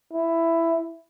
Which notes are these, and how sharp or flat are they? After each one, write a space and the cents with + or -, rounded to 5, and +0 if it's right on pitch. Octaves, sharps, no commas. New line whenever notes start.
E4 +10